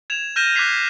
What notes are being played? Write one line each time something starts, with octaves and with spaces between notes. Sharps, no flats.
G#6 E7 F7
F6 G6 A#6 D#7 E7 G7
D6 F#6 G#6 B6 C7 F7